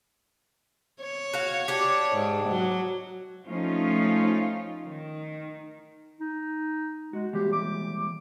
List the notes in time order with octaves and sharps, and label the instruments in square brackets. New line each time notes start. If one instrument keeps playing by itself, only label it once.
[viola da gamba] C#5
[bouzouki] F#4 F5
D4 G4
[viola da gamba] G#2
F#3
[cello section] F3 A3 C#4 D#4 F4
D#3
[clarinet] D#4
[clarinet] G#3 [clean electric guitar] F#4
[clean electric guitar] E3 G3 G#3 [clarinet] G4
[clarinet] D6